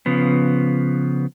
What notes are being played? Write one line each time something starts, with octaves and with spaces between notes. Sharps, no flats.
C#3 F3 B3